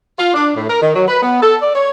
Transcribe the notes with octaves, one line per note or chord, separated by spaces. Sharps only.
F4
D4
A2
A#4
D#3
F#3
B4
B3
A4
D5
C#5